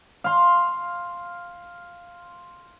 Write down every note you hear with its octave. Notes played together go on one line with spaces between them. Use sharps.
F5 C6